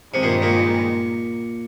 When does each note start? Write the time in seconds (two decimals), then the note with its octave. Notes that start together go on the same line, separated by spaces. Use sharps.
0.14 G2 C3 D#3 G#3
0.23 A#2
0.42 A#2